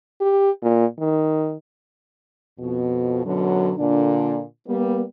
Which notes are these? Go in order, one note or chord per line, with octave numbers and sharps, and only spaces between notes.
G4
A#2
D#3
F2 B2
F#2 B2 D3 F#3
A#2 D3 D4
G3 A#3 B3